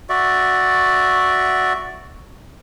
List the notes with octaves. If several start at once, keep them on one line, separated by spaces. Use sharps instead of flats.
F#4 D5 E5